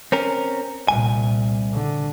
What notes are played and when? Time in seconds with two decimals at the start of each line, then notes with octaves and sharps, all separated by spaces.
0.12 C4 C#4 A#4
0.88 C2 G2 A#2 G#5
1.72 D3